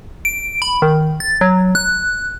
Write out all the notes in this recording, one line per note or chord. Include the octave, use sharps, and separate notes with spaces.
D7
B5
D#3
A6
F#3
F#6